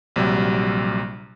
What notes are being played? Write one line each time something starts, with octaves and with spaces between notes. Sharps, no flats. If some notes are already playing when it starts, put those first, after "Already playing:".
A#1 C3 F#3 G3